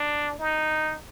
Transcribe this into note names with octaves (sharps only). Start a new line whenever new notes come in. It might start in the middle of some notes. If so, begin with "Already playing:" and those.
Already playing: D4
D#4